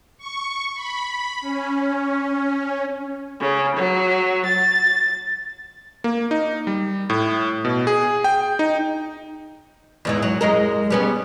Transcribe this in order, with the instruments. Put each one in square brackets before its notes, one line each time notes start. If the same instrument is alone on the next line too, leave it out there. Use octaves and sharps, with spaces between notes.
[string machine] C#6
B5
C#4
[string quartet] C#3
F#3
A6
[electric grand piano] A#3
D#4
G3
A2
B2
G#4
G5
D#4
[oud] E2 G#2 E3
F#3
F#2 G#3 A#4
G3 B3 C#4